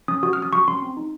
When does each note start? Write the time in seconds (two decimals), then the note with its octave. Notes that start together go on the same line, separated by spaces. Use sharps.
0.08 C#4 D#6
0.23 F#4 D#6
0.33 F6
0.38 C#4 D#6
0.53 F#4 C#6
0.68 C#4 C6
0.82 C4
0.97 D#4